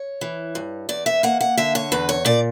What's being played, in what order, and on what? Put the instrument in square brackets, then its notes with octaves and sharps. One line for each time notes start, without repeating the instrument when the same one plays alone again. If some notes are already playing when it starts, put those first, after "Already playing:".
Already playing: [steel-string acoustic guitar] C#5
E3
G2
E2 D5
E5
A#3 F#5
F#5
D3 E5
C#5
E2 B4
C#5
A#2 D5